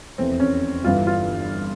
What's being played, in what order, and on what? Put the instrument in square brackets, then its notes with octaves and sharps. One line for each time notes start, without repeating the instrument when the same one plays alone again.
[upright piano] F1 E2 E3 C4
C#4
G1 G2 E3 F4
F4